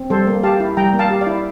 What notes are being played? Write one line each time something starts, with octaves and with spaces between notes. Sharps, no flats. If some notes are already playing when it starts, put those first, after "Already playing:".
Already playing: C4
G3 A4 C5
A#3
G4 F5 A5
E4
G3 G5 A#5
A#3
F5 A5
G4
D5 F5
E4